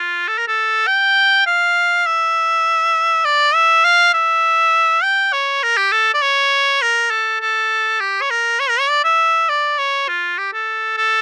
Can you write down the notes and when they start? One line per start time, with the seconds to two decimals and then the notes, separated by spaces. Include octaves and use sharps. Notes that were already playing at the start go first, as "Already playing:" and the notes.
Already playing: F4
0.28 A4
0.38 A#4
0.48 A4
0.87 G5
1.47 F5
2.06 E5
3.25 D5
3.54 E5
3.85 F5
4.14 E5
5.03 G5
5.33 C#5
5.63 A#4
5.77 G4
5.92 A4
6.14 D5
6.22 C#5
6.82 A#4
7.11 A4
7.41 A4
8.00 G4
8.22 C#5
8.30 A#4
8.60 C#5
8.70 A#4
8.80 C#5
8.90 D5
9.04 E5
9.49 D5
9.78 C#5
10.08 F4
10.38 G4
10.54 A4
10.97 A4